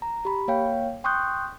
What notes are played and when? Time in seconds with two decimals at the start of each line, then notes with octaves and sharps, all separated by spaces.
0.02 A#5
0.25 G4 B5
0.48 A#3 C#5 F5 G5
1.04 G5 C6 C#6 D#6 F#6 G6